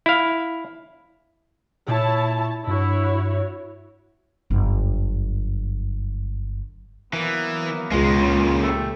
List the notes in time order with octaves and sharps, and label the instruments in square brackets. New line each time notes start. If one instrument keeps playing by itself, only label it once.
[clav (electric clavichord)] E4 F5
[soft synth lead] A#2 [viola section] E4 C#5 A5
[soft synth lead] G2 [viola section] E4 F#4 C#5
[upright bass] G1 F#2
[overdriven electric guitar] E3 [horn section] F#3 A#3 B3
[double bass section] C#2 [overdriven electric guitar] B2 G#3 [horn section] F4
[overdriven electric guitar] A#2 C#3
[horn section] E3 A3 G4